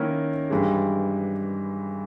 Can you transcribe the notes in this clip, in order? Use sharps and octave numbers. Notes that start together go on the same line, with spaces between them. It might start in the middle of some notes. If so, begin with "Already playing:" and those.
Already playing: D#3 A#3 C#4 E4 A#4
G2 E3 G#3